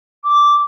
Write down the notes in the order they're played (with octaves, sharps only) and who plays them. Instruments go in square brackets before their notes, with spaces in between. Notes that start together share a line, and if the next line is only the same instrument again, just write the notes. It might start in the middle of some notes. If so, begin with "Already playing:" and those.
[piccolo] D6